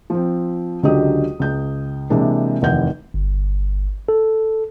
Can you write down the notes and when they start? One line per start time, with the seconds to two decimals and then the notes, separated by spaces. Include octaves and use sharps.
0.10 F3 C4
0.83 C#2 D3 F#3 G4 D#5 D#6
1.40 C#2 G6
2.10 C3 E3 G#3 A#3 D4
2.62 F1 D#2 E3 F#5 G6
3.14 G1
4.09 A4